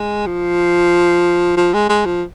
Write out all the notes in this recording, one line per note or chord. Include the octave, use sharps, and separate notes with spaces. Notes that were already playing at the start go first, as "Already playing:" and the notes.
Already playing: G#3
F3
F3
G#3
G#3
F3